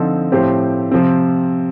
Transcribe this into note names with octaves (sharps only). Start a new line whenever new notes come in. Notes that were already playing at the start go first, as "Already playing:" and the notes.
Already playing: D3 F3 C4 D#4 A4
A2 F3 C4 G4 C5
C3 F3 C4